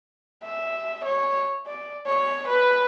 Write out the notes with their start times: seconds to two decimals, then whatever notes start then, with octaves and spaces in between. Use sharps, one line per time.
0.44 E5
1.04 C#5
1.66 D5
2.07 C#5
2.48 B4